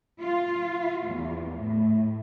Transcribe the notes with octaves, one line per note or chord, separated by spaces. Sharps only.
F4
E2
A2